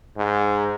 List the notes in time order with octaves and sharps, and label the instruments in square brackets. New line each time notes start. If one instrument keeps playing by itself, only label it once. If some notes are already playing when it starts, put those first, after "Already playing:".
[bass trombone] G#2